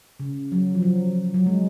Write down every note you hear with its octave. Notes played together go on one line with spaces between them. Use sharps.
C#3
F#3
F3
F#3
F#3
G#3